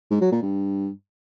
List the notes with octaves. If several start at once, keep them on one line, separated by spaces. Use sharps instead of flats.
G#2
F#3
A#2
G2